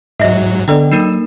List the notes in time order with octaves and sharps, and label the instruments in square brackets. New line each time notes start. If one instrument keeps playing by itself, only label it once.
[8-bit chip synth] G#2 F#3 [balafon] D#5 E5
[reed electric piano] D3 B3 [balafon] D4 A4 D5 [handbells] D#5 G5
[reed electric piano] F#3 [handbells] A#3 D#4 A#4 [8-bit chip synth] E6